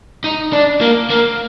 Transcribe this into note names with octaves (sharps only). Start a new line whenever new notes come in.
D#4
D4
A#3
A#3